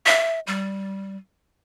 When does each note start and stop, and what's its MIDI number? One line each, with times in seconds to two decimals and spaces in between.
0.06 0.40 76
0.47 1.17 55